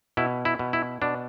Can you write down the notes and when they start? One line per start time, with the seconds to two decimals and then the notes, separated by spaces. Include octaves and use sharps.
0.17 B2 E4
0.45 E4
0.59 B2
0.73 E4
1.02 B2 D4